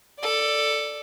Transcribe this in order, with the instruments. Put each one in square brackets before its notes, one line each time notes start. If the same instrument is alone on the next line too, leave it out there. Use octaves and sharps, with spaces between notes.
[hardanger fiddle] A4 D5